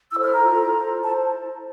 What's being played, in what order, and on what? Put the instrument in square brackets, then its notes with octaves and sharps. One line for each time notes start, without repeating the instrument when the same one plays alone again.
[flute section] E4 A4 C5 E6
F6
A#5
F4 A4 C5
F4 A4 C5
E4 A4 C5 A5